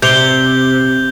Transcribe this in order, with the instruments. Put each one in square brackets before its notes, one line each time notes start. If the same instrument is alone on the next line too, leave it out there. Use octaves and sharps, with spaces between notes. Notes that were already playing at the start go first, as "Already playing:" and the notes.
[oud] C3 [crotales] G6 F7 G7